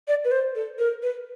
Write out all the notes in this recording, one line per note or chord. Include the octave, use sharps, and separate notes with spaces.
D5
B4
C5
A4
A#4
B4